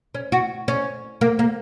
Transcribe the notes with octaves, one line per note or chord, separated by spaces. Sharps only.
C#4
F#4
C#4
A#3
A#3